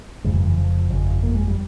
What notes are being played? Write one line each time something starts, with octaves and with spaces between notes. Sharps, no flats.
F1 F2 G#2 C#3 G#3
G2 G3
E3
F3
G1 F2 C#3
A#3
G#3
G3